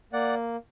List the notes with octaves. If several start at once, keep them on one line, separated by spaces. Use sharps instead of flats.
A#3 D5 F#5